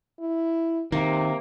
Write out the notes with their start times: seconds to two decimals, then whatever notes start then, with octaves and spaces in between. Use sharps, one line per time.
0.20 E4
0.92 C3 D#3 A#3